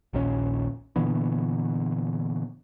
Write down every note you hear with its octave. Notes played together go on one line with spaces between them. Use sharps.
A#1 D#2 A#2 C#4
A#2 D3 E3 B3